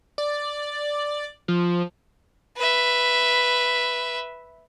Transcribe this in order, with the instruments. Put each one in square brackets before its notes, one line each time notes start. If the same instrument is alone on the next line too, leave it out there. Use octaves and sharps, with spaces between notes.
[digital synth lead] D5
F3
[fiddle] B4 E5